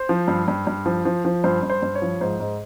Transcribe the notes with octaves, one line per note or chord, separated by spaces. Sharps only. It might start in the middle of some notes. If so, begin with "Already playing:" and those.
Already playing: C5
F3
G2
G2
G2
F3
F3
F3
G2 C5
G2
C5
G2
C#5
F3
G#2 C5
G#2